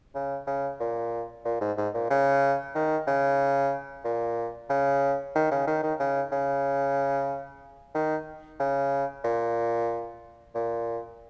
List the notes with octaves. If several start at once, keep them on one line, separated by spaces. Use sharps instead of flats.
C#3
C#3
A#2
A#2
G#2
G#2
A#2
C#3
D#3
C#3
A#2
C#3
D#3
C#3
D#3
D#3
C#3
C#3
D#3
C#3
A#2
A#2